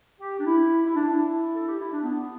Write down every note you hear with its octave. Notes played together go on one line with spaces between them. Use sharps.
G4
D4
E4
E4
D4
E4
A4
G4
E4
D4
B3